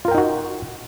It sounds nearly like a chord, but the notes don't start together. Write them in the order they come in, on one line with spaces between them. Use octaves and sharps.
F4 A#4 G5 D#4 F#4